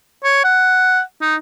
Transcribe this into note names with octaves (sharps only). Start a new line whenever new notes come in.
C#5
F#5
D#4